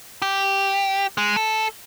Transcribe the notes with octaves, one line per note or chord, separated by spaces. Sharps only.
G4
G#3
A4